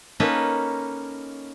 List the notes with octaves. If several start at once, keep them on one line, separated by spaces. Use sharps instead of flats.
A#3 C#4 D#4 A4 B4